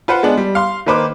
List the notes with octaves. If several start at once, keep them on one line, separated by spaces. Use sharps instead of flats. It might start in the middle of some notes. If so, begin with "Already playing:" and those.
F4 B4 C5 F#5
G#3 B3 D4
G3
F5 C6
D#3 A#3 B4 C5 D6